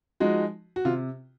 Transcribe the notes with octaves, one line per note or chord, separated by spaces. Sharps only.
F3 G#3 D#4 F#4
F#4
C3 F4